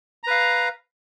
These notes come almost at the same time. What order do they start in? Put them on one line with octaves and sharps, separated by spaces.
A#5 B4 F5